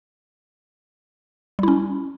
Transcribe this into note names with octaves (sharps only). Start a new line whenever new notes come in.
G3 C#4 E4